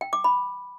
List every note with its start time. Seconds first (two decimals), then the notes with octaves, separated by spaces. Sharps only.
0.01 G5
0.13 D6
0.24 B5